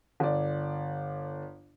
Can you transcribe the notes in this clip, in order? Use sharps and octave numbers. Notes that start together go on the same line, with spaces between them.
G1 D5